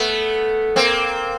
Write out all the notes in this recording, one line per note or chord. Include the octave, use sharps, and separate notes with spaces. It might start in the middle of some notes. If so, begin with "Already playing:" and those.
Already playing: A3 B3
A#3 C4